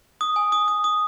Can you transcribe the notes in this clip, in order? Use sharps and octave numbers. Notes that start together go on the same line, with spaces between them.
D#6
G#5
D#6
D#6
D#6